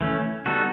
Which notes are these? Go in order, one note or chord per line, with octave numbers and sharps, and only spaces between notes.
E3 A3 C#4
G3 B3 D#4 F#4 A4